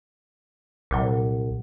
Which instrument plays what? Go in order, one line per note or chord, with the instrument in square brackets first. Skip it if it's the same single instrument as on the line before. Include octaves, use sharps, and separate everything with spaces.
[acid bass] C2 [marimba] A#2 F#3